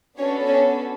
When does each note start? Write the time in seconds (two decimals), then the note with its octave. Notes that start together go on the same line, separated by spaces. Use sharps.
0.18 B3 C#4 D4 F#4 A4 C#5
0.47 C#4 C#5